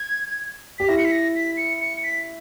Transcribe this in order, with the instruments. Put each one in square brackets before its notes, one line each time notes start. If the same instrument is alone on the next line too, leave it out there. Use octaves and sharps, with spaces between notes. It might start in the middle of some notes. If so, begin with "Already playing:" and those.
Already playing: [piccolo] G#6
[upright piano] G4 [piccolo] B6
[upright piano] E4 [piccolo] A#6
[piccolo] C#7
B6
A#6
B6
C#7
C#7
B6